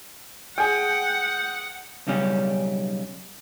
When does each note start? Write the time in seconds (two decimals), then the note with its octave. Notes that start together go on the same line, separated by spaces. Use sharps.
0.58 G#4 F#5 G5
2.07 B1 C#3 G3 C#4